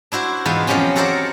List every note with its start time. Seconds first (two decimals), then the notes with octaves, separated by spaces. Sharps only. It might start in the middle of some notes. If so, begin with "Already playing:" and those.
0.12 D4 E4 F#4 C5
0.45 E2 G#2 B2 F4 B4 C5
0.67 F3 F#3 G#3 C4 C#4 G4
0.96 F#4 A4 A#4 C5 D5 F#5